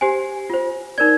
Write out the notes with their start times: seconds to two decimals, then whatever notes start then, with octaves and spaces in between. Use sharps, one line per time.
0.01 G4 C5 G#5
0.50 F4 C5
0.98 D#4 A#4 D5 G#6